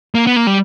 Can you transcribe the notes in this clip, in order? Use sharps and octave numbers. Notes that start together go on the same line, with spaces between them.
A#3
B3
A#3
G3